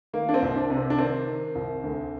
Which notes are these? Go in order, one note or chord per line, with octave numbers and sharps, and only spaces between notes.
D#3 A#3
D4
C4
C2
D4
C3
C4
D4
D#3 C4
D#3
C2
D2